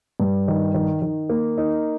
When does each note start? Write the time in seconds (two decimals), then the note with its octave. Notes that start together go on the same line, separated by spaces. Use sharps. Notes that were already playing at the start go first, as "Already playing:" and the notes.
0.20 G2
0.48 D#3
0.74 D#3
1.02 D#3
1.29 A#3
1.58 D#4